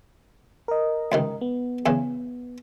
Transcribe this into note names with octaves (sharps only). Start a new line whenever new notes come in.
A#4 D#5
C#2 C3 D#3
B3
E2 C#3 E3